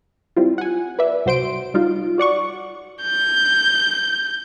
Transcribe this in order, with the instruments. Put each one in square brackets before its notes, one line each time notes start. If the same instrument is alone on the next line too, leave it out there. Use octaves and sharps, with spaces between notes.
[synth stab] G3 C4 E4 F4
F#5 G#5
B4 D5 E5
C2 F#4 C5 C6 D7
G3 D#4 F4
F#4 D5 F#5 C#6
[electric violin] G6